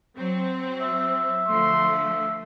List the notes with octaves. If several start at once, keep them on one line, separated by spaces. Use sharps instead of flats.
F#3 C4
E5
D3 F3 A3 C6